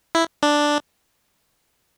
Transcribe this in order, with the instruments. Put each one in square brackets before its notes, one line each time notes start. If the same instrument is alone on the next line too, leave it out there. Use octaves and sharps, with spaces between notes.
[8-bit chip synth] E4
D4